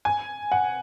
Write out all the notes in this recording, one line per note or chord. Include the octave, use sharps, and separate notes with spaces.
G#5
F#5